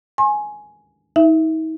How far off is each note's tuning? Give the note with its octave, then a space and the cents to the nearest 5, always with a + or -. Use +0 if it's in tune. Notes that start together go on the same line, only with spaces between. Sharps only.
G#5 +10 C6 +45
D#4 +40 E5 +10